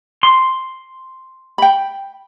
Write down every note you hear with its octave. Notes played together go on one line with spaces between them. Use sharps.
C6
G5 B5